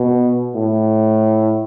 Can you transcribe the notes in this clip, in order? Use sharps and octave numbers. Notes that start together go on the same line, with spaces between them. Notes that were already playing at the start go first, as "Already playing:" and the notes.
Already playing: B2
A2